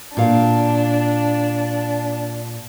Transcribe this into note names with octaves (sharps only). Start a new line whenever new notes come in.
A#2 D4 F5